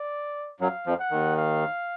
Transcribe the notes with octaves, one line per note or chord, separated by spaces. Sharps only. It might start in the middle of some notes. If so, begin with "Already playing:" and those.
Already playing: D5
F#2 F#3 F5
F2 F3
F#5
D#2 D#3
F5